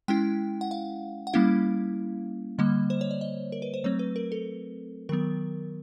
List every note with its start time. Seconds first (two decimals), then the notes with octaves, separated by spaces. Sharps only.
0.08 G#3 C#4 E4 G5
0.61 F#5
0.71 F5
1.27 F#5
1.33 G3 A#3 C#4 E4 F5
2.58 D3 G3 A#3 D#5
2.90 C5
3.01 C#5
3.11 D5
3.21 D#5
3.52 A#4
3.62 B4
3.74 C5
3.84 F#3 A3 C4 C#5
3.99 B4
4.16 A#4
4.32 A4
5.09 D#3 F#3 B3 A#4